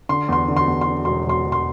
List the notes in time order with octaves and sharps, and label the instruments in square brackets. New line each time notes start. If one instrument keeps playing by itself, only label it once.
[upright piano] D3 C6
E2 C6
D3
C6
E2
C6
D3
E1 C6
E1 C6
E1
C6